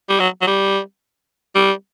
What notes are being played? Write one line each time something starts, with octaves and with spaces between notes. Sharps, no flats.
G3
F#3
F#3
G3
G3